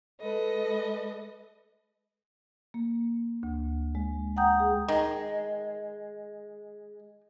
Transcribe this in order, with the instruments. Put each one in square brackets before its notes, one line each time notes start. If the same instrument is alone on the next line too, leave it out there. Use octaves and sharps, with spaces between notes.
[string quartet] G#3 A4 B4 D#5
[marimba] A#3
D2
G#3
F#5 G5 A#5 D#6 G6
G#4
[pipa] D#3 [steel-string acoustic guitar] G#3